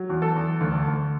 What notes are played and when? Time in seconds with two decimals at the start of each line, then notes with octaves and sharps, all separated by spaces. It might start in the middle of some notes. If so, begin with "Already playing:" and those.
Already playing: F#3
0.09 E2
0.22 A4
0.36 E2
0.61 D2
0.87 D2